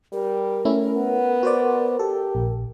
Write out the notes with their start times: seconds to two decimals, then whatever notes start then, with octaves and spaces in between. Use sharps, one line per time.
0.13 G3 A#4
0.65 A3 C#4 E4
0.96 B3
1.43 F#4 C5 D5
1.99 G4 A4
2.35 A#1